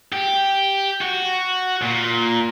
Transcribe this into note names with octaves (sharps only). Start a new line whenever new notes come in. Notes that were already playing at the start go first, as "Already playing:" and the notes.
G4
F#4
A#2